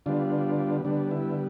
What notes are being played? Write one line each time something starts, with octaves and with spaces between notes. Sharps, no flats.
D3 G3 B3 D4 F4
D3 G3 B3 D4
E4